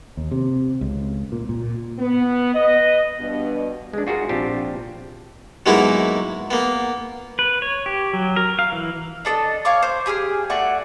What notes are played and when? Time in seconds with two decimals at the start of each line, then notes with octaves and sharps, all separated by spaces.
0.17 D#2
0.31 C3
0.81 C#2
1.32 A#2
1.49 A#2
1.98 B3
2.54 B4 D#5
3.18 G2 B2
3.93 G#3 D4
4.07 F4 F#4 G#4 A#4
4.29 A#1 C4 D4 F4 G4 A5
5.66 F#3 G#3 A#3 B3 D#4 E4
6.51 A#3 B3
7.39 B4
7.62 C#5
7.86 G4
8.13 F#3
8.36 A#4
8.59 F5
8.72 E3
9.25 D4 A4 D5 D#5
9.65 C#5 F5 C#6 D6
9.83 C5
10.06 G4 G#4 E6 F6
10.50 A3 F#4 D5